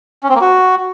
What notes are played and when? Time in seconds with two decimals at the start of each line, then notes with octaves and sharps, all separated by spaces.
0.23 C#4
0.29 C4
0.35 A#3
0.41 F#4